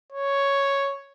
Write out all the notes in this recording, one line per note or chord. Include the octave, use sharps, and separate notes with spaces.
C#5